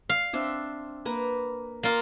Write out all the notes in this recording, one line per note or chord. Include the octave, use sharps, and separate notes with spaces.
F5
C4 D4 E5
A#3 B4 A#5
A#3 F4